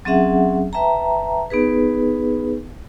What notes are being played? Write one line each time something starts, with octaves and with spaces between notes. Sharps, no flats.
F#3 C4 C#4 G#4 E5 F#5
B4 E5 G5 A5 A#5
B3 D#4 G#4 B4